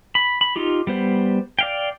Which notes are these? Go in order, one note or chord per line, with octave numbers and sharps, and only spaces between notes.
B5
B5
D#4 F4 G4
G3 B3 C5
D5 F5 G5